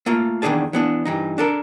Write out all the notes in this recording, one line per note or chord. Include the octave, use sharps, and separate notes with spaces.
A3 A#3 F4
E2 D#3 A#3 D4 G#4 A5
E3 B3 D4
G2 E3 D#4
D4 A4 A#4